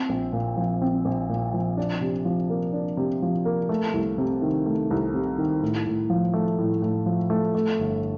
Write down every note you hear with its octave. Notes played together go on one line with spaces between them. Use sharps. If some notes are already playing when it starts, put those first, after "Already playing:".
Already playing: C4
A#1
A#2
F3
C4
A#1
A#2
F3
D4
C3
F3
A#3
D4
C3
F3
A#3
A3
C2
C3
D#3
A3
C2
C3
D#3
A2
A2
F3
A3
A2
A2
F3
A3
A3
G1